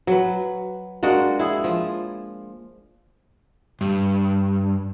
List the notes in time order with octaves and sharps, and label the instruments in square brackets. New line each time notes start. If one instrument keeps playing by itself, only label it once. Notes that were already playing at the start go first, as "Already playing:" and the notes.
[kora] F#3 B4
G#3 A#3 D4 F#4
E4 G#4
F3
[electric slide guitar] G2